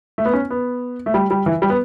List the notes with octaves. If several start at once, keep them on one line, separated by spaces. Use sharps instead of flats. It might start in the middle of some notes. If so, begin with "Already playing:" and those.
A3
B3
C#4
B3
A3
G3
G3
E3
G3
B3